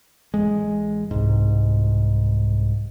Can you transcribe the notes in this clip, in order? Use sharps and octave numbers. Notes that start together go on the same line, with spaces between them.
A1 G#3
C2 G#2